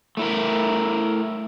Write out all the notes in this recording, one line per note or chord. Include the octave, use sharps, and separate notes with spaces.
A3 E4 A#4